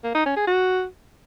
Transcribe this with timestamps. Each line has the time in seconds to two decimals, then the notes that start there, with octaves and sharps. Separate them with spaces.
0.04 A#3
0.15 D#4
0.26 C#4
0.36 G#4
0.47 F#4